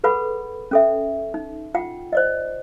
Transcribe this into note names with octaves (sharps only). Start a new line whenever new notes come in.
G#4 A4 B4 F#5 B5
C#4 A4 E5
D#4
F4 F#5 G5
C5 D5 D#5